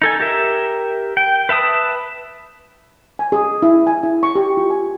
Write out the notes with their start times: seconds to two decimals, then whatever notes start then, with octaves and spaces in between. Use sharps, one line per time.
0.02 D#4 A4 G#5
0.20 G4 A#4 E5
1.17 G5
1.49 B4 E5 A5 D#6
3.19 G#5
3.32 G#4
3.62 E4
3.87 G#5
4.03 E4
4.23 C#6
4.35 G4
4.57 F4
4.70 G#5